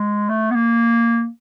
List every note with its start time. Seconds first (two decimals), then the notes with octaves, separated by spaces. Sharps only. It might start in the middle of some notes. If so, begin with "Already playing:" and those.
Already playing: G#3
0.29 A3
0.51 B3
0.55 A#3